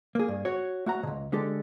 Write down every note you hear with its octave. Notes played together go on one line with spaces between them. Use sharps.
A#3 G#4
G2
F#4 C#5
A3 F#4 F#5 A#5
C#2 B2
D3 G#3 G4 A4